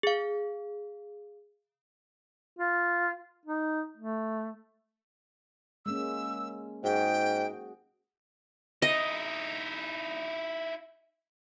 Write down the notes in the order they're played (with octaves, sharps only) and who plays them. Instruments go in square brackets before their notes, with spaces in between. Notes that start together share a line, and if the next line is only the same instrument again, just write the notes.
[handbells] G#4 F5
[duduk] F4
D#4
A3
[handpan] G#3 A#3 C#4 [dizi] E6
[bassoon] G#2 [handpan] F#4 G#4 [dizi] G5
[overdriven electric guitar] D#4 E4 [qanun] D#5